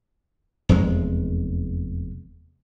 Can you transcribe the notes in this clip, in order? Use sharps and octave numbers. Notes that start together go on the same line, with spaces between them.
F1 E2 G#3